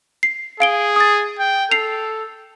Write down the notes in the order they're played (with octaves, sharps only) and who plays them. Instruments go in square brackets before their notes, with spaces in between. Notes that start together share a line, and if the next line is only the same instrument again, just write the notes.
[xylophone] C7
[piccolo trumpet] G#4 [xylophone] F5 D7 G7
[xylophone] D#6 A6
[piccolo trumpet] G5
[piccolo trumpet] A4 [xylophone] C7 F7